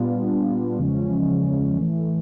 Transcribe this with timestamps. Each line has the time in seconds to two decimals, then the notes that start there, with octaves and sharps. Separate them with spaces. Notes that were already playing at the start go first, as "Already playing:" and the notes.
Already playing: A#2 G3 B3 D4 F4
0.78 E2 C#3 F3 G#3 C#4
1.78 A2 E3 A3